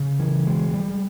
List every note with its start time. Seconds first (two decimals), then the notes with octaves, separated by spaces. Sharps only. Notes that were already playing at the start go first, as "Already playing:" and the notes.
Already playing: C#3
0.20 E3
0.46 G#3
0.74 G3